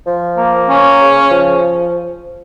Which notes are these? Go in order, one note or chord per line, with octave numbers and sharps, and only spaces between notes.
F3
A#3
C#4
C#3
F3